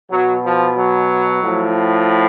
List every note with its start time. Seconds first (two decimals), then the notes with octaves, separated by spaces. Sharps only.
0.11 B2 F#3
0.44 F3
0.77 F#3
1.42 A2 F3